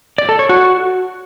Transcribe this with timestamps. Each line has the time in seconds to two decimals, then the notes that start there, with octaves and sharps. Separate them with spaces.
0.18 D5
0.29 A4
0.39 C#5
0.49 F#4